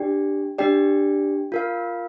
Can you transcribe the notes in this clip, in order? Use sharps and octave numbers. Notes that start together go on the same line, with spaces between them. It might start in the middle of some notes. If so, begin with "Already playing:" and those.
Already playing: D4 G4 D5 G5
D4 G4 D5 G5
F4 A#4 F5